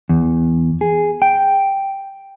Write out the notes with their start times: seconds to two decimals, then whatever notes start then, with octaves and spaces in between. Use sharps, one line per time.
0.09 E2
0.81 G#4
1.22 G5